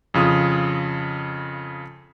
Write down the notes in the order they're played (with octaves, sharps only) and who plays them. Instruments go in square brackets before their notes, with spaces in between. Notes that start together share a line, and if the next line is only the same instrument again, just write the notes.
[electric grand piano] F2 C#3 F4 D#6